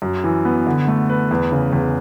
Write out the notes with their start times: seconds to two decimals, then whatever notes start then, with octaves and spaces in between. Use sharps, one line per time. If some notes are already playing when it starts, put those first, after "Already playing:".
0.02 F#2
0.24 E3
0.45 B3
0.67 D3
0.88 A3
1.09 B4
1.31 E2
1.52 C#3
1.73 E2